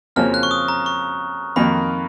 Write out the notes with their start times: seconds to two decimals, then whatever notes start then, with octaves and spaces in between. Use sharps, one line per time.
0.16 F2 C#3 F3 A#3 C#4 F6
0.34 F#6
0.43 C#6
0.51 D#6
0.68 A#5
0.86 C#6
1.56 F2 D#3 A#3 D#4 B5